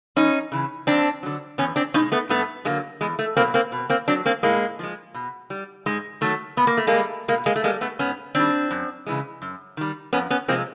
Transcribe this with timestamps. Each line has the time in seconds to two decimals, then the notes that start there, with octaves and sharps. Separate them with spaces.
0.16 E2 C#4 D#4
0.52 C#3 E3
0.87 F2 C4 D4
1.23 D3 F#3
1.58 E2 B3 C#4
1.76 C4 D4
1.94 B2 C#4 D#4
1.98 G#3
2.12 A3 B3
2.29 G2 A3 B3
2.65 D3 F#3 G#3 A#3
3.01 E2 G#3
3.19 A3
3.37 B2 F#3 A#3 C4
3.54 A#3 C4
3.72 B2
3.90 A#3 C4
4.08 F#3 C4 D4
4.26 A#3 C4
4.43 A2 G#3 A#3
4.79 F3 G#3
5.14 B2
5.50 G3
5.86 G#2 G#3
6.21 D#3 F#3 A3
6.57 A#2 B3
6.67 A#3
6.77 A3
6.87 G#3 A#3
6.93 G3
7.28 B2 G#3 A#3
7.46 G#3 A#3
7.56 A3
7.64 G3 G#3 A#3
7.81 A3 B3
7.99 G#2 B3 C#4
8.35 D#3 G3 C4 D4
8.71 F#2
9.07 C#3 E3 G#3
9.42 F#2
9.77 D#3 G3
10.13 F2 B3 C#4
10.30 B3 C#4
10.48 C3 F3 G#3 A#3 C4